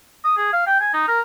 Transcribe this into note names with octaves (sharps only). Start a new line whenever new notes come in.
D#6
G#4
F5
G5
G#5
D#4
A#4